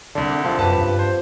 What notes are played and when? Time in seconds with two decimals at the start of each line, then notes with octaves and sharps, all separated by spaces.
0.15 C2 D3 D4
0.44 F3 C4
0.59 F#2 G4 B4 A5
0.78 G2
0.99 C5